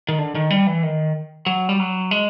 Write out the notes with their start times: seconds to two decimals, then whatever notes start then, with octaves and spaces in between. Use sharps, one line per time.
0.09 D#3
0.19 D3
0.35 D#3
0.50 G3
0.67 E3
0.83 D#3
1.46 F#3
1.69 G3
1.79 F#3
2.11 G#3